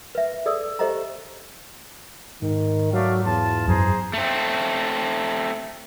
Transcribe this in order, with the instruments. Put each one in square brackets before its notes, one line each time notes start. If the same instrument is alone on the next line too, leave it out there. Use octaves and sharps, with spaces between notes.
[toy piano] B4 E5
G#4 A4 D5 D#6 E6
G4 A4 C5 D#5 E5 A#5
[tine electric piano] G#2 [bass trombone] D#3
[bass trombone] F#3 [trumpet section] A3 D5 F5
[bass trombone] E2 [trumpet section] F4 A5
[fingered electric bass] F#2 F#3 [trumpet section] G#4 C5 A#5
[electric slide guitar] A3 C4